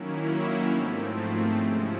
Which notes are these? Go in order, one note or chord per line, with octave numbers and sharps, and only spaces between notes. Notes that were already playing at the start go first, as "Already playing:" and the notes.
Already playing: D#3 F#3 A#3 C#4 E4
G#2 F3 A3 C4
C3 F3 G#3 C#4 E4